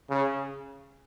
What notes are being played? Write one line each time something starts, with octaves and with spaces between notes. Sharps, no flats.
C#3